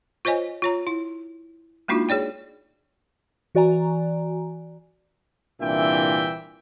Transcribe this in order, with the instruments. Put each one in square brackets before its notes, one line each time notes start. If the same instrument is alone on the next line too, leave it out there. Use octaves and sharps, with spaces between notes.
[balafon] F4 C5 C#5 D#5 G#5
F4 C#5 A#5
E4
G#3 A#3 D4 D#4 F4 F#4
G#4 C#5 D5 G5
[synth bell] E3 F#4 D5 G#5 A#5
[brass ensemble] C2 A#2 E3 D4 E5 G5